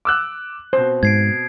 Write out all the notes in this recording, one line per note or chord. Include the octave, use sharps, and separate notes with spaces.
D6 E6 F#6
B2 C4 C5
G#2 G#6 C7 D7